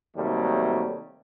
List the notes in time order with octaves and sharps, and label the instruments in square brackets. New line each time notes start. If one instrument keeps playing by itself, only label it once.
[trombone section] D#2 C3 F#3 G3 A3